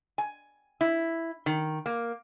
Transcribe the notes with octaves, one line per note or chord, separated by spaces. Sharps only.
G#5
E4
D#3
A#3